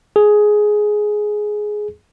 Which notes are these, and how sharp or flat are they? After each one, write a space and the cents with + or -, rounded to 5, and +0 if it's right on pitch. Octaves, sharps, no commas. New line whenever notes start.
G#4 +10